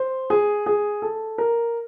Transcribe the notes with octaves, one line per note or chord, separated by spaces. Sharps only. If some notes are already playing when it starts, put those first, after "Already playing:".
Already playing: C5
G#4
G#4
A4
A#4